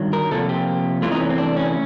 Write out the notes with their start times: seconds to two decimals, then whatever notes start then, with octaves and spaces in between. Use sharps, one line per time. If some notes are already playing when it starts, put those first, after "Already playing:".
Already playing: G2 D#3 F#3
0.13 A#4
0.31 C3 F3 A#3 A4
0.49 G4
1.02 E2 C3 E3 A3 F4
1.11 D#4
1.20 C#4
1.30 C4
1.38 D4
1.56 C#4